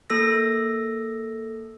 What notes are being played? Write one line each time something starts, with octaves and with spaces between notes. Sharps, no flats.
A#3 A4 E6 A#6